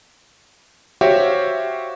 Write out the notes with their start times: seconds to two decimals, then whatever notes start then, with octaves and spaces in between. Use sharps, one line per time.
1.01 F#4 G4 C5 C#5 E5 F5